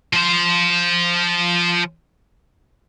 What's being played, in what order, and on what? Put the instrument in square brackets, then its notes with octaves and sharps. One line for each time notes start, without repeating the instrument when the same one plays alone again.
[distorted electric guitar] F3 C5